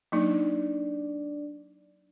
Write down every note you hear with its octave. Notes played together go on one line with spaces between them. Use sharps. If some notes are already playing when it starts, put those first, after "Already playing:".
F#3 A#3 D4 D#4 D5